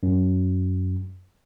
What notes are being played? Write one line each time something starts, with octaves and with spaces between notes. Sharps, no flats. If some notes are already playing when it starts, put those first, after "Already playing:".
F#2